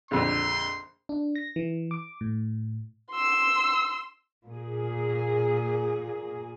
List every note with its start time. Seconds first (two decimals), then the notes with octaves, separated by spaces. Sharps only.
0.11 A#1 F2 D3 C6
1.09 D4
1.36 A#6
1.56 E3
1.91 D6
2.21 A2
3.11 C6 E6
4.48 A#2 G#4